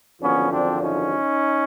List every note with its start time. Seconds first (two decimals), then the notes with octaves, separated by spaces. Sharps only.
0.21 G#1 F#2 D3 F3 B3 C#4
0.51 C4 D4
0.81 C#4 D#4